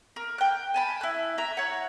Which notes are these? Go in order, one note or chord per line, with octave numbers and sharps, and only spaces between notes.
A#4
G5 F#6
G#5 A5 B5
E4 F#6
E5 A#5
C#5 F#5